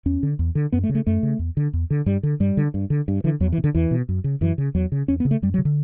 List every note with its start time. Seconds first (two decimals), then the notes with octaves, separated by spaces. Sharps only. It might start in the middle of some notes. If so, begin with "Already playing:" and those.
0.06 E2 C#4
0.23 D3
0.39 E2
0.55 D3
0.72 F#2 B3
0.84 A3
0.89 C#3
0.95 A3
1.07 F#2 A3
1.23 C#3
1.39 E2
1.57 D3
1.73 E2
1.90 D3
2.06 G2 G3
2.23 D3
2.40 G2 G3
2.57 D3
2.74 G2
2.90 D3
3.08 G2
3.24 D3 E3
3.40 E2 F#3
3.52 E3
3.58 B2
3.64 D3
3.75 E2 E3
3.91 B2
4.09 F#2
4.24 C#3
4.41 F#2 E3
4.58 C#3
4.75 E2 F#3
4.92 C#3
5.08 E2 C#4
5.20 B3
5.25 C#3
5.31 A3
5.42 F#2 G3
5.54 F#3
5.58 C#3
5.65 D3